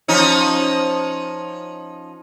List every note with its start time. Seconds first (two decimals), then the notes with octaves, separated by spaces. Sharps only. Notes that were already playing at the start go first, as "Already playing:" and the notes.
0.08 F3 C#4 D#4